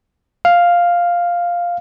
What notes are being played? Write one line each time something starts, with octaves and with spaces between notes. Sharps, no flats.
F5